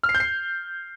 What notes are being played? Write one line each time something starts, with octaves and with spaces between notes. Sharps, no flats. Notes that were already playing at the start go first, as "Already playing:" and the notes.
F6
C7
G6
C7